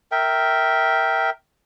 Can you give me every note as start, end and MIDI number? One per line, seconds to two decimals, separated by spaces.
0.12 1.30 70
0.12 1.30 76
0.12 1.30 79